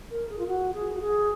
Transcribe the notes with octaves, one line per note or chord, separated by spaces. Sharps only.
A#4
G#4
F4
F#4
G#4
F#4
G#4